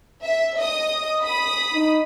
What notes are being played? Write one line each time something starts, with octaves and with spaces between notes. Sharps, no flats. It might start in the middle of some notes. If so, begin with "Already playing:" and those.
E5
D#5 D#6
B5 D#6
D#4